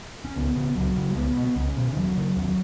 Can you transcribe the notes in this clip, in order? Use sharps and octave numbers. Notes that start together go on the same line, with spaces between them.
C#4
C#2 B3
C#3
C#2 F#3
C#3
G#3
C#2 B3
B2
B3
C#2 C#4
B2
D#3
D#2 F#3
C#3
D#2